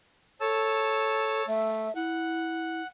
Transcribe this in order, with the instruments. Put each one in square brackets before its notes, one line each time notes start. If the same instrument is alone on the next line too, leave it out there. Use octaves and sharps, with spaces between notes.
[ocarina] A4 [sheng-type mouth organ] C#5 A5 E6
[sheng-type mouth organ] A3 [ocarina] E5
[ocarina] E4 [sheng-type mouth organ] F#5